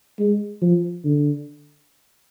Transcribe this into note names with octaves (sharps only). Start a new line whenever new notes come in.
G#3
F3
D3